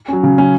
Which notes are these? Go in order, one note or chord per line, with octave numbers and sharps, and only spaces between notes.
F#3 C#4
C#3
F#3 C#4